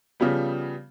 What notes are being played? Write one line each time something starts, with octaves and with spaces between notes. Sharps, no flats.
C#3 F3 G3 B3